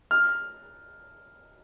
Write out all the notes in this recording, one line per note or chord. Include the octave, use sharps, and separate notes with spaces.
F6